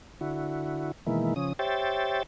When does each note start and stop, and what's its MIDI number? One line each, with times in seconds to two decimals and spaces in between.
0.21 0.92 50
0.21 0.92 64
0.21 0.92 66
1.06 1.34 47
1.06 1.34 51
1.06 1.34 52
1.06 1.34 56
1.06 1.34 58
1.06 1.34 64
1.36 1.53 49
1.36 1.53 53
1.36 1.53 61
1.36 1.53 87
1.59 2.23 67
1.59 2.23 72
1.59 2.23 73
1.59 2.23 76
1.59 2.23 79
1.59 2.23 93